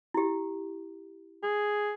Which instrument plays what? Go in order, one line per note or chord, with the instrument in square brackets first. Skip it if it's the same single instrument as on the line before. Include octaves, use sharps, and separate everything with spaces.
[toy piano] E4 G4
[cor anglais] G#4